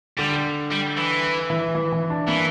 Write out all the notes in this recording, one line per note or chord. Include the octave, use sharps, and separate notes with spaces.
D3 G3
G3
E3
E3
E3
E3
D4
E3 A#3